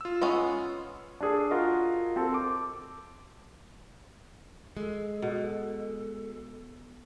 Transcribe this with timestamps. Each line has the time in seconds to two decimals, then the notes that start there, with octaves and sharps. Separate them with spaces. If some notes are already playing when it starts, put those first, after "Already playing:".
0.01 F4 E6
0.21 G#3 B3 C#4
1.20 D4 G#4 A4
1.51 F4 F#4 A#4 D#5
2.16 C4 A4
2.34 D6
4.77 G#3 A4
5.22 B2